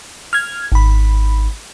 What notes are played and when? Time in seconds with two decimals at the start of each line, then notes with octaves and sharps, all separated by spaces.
0.33 F6 G#6
0.72 G#1 B5